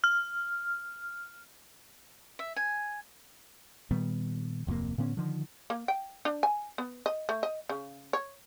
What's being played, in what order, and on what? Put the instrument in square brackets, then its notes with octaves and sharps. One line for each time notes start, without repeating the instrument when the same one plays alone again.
[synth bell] F6
[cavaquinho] E5
G#5
[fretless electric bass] A#2 D#3 G3 B3
D1 F2 C3 A#3
A2 D3 B3 C#4
D3 D#3 F3
[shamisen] A#3
G5
D4
G#5
B3
D#5
A3
D#5
C#3
C#5